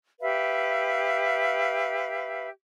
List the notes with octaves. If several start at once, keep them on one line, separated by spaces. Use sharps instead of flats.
G4 B4 E5 F5